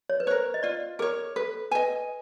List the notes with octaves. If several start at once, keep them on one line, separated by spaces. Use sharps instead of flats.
C#5
B4
A#4 C5 C#5
D#5
F4 D5
G#4 A#4 C#5
A4 B4
B4 D#5 G#5